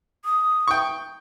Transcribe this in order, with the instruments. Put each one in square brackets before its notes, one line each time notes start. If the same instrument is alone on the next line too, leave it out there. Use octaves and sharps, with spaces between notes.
[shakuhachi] D#6
[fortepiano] G5 C#6